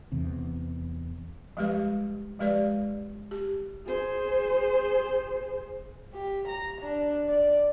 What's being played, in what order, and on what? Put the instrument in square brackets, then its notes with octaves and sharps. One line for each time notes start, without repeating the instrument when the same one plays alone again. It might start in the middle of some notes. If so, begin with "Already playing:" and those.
[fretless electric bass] E2 C3
[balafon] F3 G3 G#3 G4 B4
F3 G#3 G4 B4 D5
G4
[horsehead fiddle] G#4 C5
[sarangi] G4
A#5
D4
D5